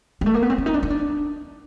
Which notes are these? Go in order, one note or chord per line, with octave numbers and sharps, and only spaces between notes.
G#3
A3
A#3
B3
C4
C#4
D#4
D4
D#4
D4